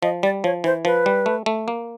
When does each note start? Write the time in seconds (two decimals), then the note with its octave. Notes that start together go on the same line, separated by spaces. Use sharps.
0.03 F3 D#5
0.23 G3 D5
0.44 F3 C#5
0.64 E3 C5
0.85 F3 B4
1.06 G3
1.26 A3
1.46 A3
1.68 A#3